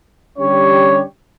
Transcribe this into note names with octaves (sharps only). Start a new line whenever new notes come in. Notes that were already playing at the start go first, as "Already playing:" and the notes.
D3 G3 C#4 G4 C#5